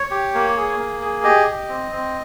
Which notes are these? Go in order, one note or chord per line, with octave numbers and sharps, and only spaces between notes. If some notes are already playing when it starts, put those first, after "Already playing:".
Already playing: C#5
G4
A#3
G#4
A#3
G#4
G4 D#5
G4
C4
C4